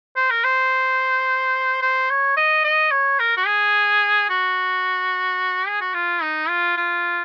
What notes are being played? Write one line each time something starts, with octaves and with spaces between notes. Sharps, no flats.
C5
A#4
C5
C5
C#5
D#5
D#5
C#5
A#4
F#4
G#4
F#4
G#4
F#4
F4
D#4
F4
F4